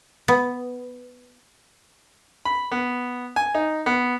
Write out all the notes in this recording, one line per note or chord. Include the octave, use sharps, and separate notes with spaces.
B3
B5
B3
G#5
D#4
B3